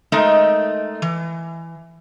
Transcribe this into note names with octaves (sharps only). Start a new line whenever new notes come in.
G#3 A3 D#4 A#4 D#5
E3